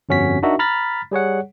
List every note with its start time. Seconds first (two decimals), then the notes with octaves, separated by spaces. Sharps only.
0.09 G1 F2 C#4 F#4 B6
0.43 D4 D#4 F#4 A#4 E5
0.59 A#5 B5 F6 A6 B6
1.11 G3 G#4 C#5 F#5